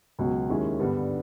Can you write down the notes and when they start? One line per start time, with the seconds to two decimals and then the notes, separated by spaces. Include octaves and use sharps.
0.19 C#2 B2 F#3
0.49 D#2 D#3 G#3 C#4 E4
0.79 G2 D3 G3 B3